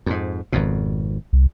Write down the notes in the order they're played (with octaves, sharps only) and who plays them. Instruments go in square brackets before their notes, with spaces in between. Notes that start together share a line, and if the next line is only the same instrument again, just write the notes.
[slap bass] F2 G#2
G#1 F2 B2
[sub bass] C2